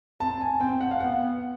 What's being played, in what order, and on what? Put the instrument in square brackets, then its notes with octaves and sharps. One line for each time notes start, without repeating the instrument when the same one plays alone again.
[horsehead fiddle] C4 [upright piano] A5
[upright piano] G#5
[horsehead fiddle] C4 [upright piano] G5
[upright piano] F#5
F5
[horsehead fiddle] B3 [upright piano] F#5